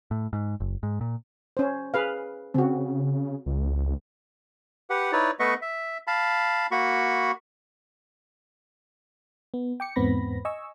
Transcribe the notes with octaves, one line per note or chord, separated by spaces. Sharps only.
A2
G#2
F#1
G#2
A#2
C#4 C5
G#4 B4 F5
C#3 C4 F#4
C#2
G4 B4 F#5
D#4 E4 B4 C#5 D5
A3 B3 B4 D#5 E5 C#6
E5
F5 A5 B5
A#3 F#4 B5 C#6
B3
G5 D6 C#7
E2 G#2 B3 C4 B5 A#6
D#5 G#5 C#6 E6